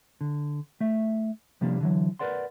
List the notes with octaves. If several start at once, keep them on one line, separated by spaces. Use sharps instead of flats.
D3
A3 E5
C3 F3 G3 A#3 D4
D3 E3 F#3
A#4 B4 D5 F#5 C6